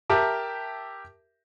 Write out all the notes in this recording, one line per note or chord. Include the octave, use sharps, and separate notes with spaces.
G4 A#4 E5 A5 D6